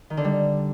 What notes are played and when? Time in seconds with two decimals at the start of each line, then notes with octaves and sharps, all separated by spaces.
0.10 D#3
0.17 D3
0.24 G3